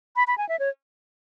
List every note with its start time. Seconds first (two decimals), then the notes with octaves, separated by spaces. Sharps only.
0.16 B5
0.27 B5
0.38 G#5
0.49 E5
0.59 C#5